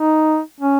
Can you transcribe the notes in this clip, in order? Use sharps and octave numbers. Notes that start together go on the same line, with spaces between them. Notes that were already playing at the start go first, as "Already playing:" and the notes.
Already playing: D#4
C#4